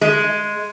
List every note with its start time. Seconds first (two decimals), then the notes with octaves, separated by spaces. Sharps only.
0.01 G#3